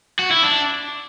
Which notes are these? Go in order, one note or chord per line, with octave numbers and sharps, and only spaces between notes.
F#4
E4
D4